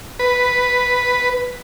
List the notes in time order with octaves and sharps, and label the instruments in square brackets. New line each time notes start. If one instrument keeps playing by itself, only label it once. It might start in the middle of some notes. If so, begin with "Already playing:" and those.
[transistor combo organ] B4